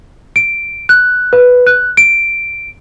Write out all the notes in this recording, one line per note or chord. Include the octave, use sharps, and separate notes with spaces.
D7
F#6
B4
F#6
D7